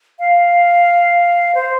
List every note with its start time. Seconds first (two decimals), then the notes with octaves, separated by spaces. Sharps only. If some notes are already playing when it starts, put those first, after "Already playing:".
0.19 F5
1.55 C5